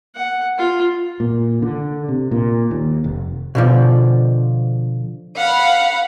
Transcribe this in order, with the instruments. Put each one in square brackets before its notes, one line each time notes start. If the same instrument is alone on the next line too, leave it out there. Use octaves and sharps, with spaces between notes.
[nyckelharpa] F#5
F4
[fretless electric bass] A#2
D3
C3
A#2
D#2
F1
[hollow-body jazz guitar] B2 D3 F3
[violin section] F5 F#5 B5